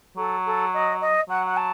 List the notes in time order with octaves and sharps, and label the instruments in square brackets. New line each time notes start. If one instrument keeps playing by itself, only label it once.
[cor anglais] F#3 [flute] A4
[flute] A4
D#5
D#5
[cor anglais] F#3 [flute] F#5
[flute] F#5
A5